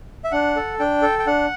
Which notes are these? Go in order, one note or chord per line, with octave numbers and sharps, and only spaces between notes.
E5
D4 F#5
A4
D4 G5
A4
G5
D4 F#5